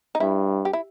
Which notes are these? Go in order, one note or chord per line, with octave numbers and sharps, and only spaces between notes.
D#4
G2 E4
G4
E4